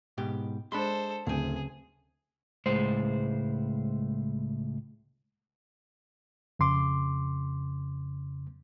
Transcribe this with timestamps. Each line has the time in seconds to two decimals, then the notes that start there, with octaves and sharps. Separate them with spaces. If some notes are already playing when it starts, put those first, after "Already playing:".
0.18 G#2 B2 G4
0.72 G#3 D4 A4 C5 B5 C6
1.27 D1 D2 C#3 C4 G#4
2.66 C#2 A2 G#3 C5
6.59 F2 C#3 C6 D6